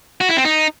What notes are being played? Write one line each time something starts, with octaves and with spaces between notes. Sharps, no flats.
F#4
E4
C4
D#4